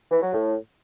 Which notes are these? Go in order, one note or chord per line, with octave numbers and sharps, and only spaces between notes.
E3
F#3
A2